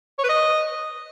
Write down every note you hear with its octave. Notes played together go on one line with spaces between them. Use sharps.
C#5
B4
D#5